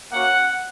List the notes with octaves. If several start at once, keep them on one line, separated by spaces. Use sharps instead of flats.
A#3 C#4 F#4 F#5